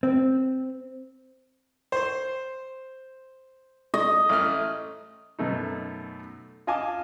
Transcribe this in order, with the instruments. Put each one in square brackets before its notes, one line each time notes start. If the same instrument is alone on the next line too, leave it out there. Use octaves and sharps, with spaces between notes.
[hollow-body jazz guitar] C4
[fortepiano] C5 C6
[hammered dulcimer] D#5
[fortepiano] A1 A3 F6
F#2 B2 A3 D#4
F4 D#5 F5 G#5 A5 D6